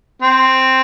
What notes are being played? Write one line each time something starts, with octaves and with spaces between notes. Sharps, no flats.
C4